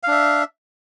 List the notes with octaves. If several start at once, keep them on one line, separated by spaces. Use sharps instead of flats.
D4 E5 F5